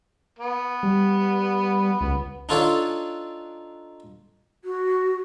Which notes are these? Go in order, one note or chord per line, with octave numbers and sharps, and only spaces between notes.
B3
G3
C#2
D4 D#4 F4 A4 C#5 D5
F#4